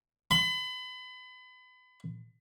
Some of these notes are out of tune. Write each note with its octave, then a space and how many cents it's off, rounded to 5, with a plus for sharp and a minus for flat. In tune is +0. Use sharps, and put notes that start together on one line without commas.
B5 +35